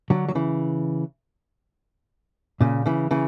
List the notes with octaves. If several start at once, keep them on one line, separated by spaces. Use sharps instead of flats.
D3 F#3
F#3
C#3 E3
A#2 C#3
C#3 E3
C#3 E3